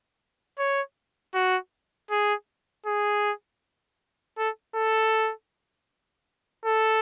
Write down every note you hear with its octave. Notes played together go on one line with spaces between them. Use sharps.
C#5
F#4
G#4
G#4
A4
A4
A4